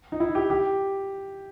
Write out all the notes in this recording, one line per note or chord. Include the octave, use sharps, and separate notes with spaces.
D#4
E4
G4
G4